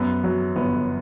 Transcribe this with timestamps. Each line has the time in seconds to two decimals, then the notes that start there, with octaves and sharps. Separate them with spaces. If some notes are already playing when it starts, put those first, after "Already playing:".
Already playing: F#2 B3
0.24 F#3
0.56 G1 B3